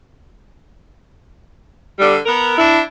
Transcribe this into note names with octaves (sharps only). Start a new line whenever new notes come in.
D3 G3
B3 A#4
D4 E4